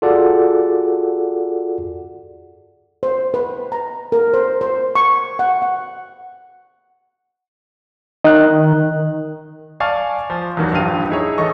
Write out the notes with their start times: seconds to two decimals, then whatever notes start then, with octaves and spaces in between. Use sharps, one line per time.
0.02 F4 F#4 G#4 A4 D5 F#5
3.03 C5
3.34 B4
3.72 A#5
4.12 A#4
4.34 C5
4.61 C5
4.95 C#6
5.39 F#5
5.62 F#5
8.24 D#3 D#5 F#6
9.80 D5 F5 G#5 A5 C#6
10.30 F3
10.57 E2 D#3 F#3 G3
10.71 A#1 G2 G4 F5 D#7
11.09 D#4 E4 G#4 C#5
11.38 A1 A4 D#5 C#6